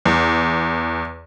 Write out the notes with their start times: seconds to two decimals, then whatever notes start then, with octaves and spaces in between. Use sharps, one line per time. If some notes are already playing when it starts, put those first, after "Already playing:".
0.05 E2